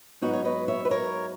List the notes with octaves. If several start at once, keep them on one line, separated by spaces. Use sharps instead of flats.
G#2 F#3 B3 D#4 F#4
C#5
B4 D#5
C#5 E5
B4
A#4 C#5